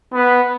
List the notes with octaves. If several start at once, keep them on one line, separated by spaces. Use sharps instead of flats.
B3